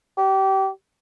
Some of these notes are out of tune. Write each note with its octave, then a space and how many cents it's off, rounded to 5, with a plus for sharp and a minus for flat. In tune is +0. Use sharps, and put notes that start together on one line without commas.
G4 -25